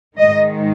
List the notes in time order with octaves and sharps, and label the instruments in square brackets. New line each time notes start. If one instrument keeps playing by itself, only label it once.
[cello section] G#2 D#3 G#3 D#5